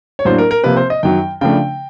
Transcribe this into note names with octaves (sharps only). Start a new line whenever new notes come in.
C#5
A2 F#3 A#3 D4 C5
A#4
A#4
C3 F3 A#3 B4
C5
D#5
F#2 D#3 F#3 G5
C#3 F3 A3 D4 G5